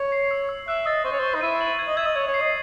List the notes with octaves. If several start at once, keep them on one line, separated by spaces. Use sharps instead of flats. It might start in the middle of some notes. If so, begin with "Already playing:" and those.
Already playing: C#5
C7
E6
E6
E5 F#6
D#5 A6
C5 C#6
C#5
C5 C#6
D#4
E4 D#7
F#7
G#6
D#5
E5 G#6
D#5
C#5 G#6
C#5
C7
D#5